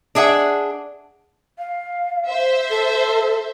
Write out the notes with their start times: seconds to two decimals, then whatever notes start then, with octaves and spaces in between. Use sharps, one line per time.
0.15 D4 G#4 E5 F#5
1.58 F5
2.26 C5 E5
2.70 A4